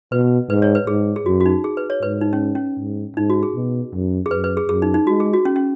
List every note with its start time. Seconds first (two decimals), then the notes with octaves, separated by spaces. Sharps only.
0.12 B2 B4
0.50 G#2 B4
0.62 C#5
0.75 B4
0.87 G#2 G#4
1.16 G#4
1.26 F#2 F#4
1.40 F#4
1.46 D#4
1.64 G#4
1.77 B4
1.90 C#5
2.02 G#2 B4
2.21 D#4
2.33 C#4
2.55 C#4
2.79 G#2
3.16 G#2 D#4
3.30 F#4
3.43 G#4
3.55 B2
3.93 F#2
4.26 G#4
4.31 F#2 B4
4.44 B4
4.57 G#4
4.69 F#2 G#4
4.82 D#4
4.94 D#4
5.07 G#3 F#4
5.20 G#4
5.33 F#4
5.45 C#4
5.56 C#4